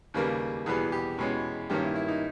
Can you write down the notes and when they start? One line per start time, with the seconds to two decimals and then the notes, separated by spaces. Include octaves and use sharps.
0.14 D#2 C#3 G3 A#3 B4
0.66 E2 B2 G3 B3 G#4
0.92 G4
1.18 E2 B2 G#3 C#4
1.70 G2 D#3 A#3 C#4 G4
1.83 E4
1.96 E4
2.08 D#4